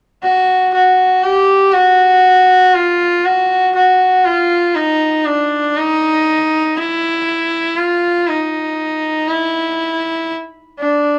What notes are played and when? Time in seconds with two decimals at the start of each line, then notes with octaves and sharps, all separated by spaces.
0.23 F#4
0.74 F#4
1.23 G4
1.73 F#4
2.74 F4
3.25 F#4
3.75 F#4
4.25 F4
4.75 D#4
5.26 D4
5.77 D#4
6.77 E4
7.77 F4
8.28 D#4
9.28 E4
10.79 D4